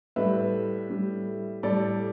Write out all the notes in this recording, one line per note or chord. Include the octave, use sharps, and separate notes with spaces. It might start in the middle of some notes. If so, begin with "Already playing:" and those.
A2 G3 B4 E5
A2 G3
A2 G3 A4 D5